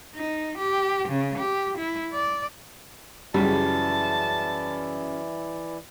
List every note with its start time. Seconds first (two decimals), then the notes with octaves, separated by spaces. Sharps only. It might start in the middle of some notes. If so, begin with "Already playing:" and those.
0.15 D#4
0.58 G4
1.09 C#3
1.38 G4
1.78 E4
2.13 D5
3.34 F#2 C#3 E3 G3 E4 D5 A5